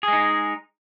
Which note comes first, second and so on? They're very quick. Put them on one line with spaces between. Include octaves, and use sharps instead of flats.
G#4 G#3 D#4